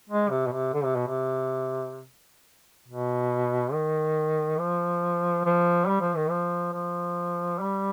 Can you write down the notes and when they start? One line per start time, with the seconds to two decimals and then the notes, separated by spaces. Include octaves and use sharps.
0.09 G#3
0.30 C3
0.47 B2
0.51 C3
0.74 D3
0.84 C3
0.96 B2
1.07 C3
2.88 B2
3.73 D#3
4.59 F3
5.45 F3
5.87 G3
6.01 F3
6.16 D#3
6.30 F3
6.73 F3
7.60 G3